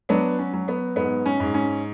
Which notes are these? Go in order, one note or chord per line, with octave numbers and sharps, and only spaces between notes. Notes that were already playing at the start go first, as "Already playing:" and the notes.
F#3 B3 D4
C#4
F#3
B3
G#2 B3
C#4
G#2
C#4